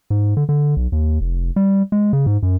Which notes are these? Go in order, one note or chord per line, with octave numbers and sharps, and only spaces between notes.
G#2
D3
D3
B1
D#2
F1
G3
G#3
C#3
G#2
F#2